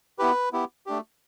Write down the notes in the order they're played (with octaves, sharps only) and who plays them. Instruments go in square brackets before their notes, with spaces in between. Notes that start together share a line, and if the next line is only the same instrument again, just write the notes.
[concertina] B3 E4 G4 B4
B3 E4 G4
A3 D4 G4